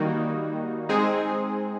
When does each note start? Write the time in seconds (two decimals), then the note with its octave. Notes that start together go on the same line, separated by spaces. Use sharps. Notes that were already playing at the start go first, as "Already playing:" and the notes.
Already playing: D#3 G3 A#3 D#4 F#4
0.89 G#3 C4 D#4 G#4